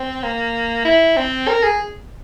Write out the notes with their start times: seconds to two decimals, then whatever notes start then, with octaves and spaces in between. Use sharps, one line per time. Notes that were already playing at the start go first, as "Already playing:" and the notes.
Already playing: C4
0.23 A#3
0.85 E4
1.17 C4
1.48 A#4
1.63 G#4